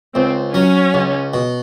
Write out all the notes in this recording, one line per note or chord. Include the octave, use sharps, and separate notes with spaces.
C#2 C4
F#3 C#4
C#2
B2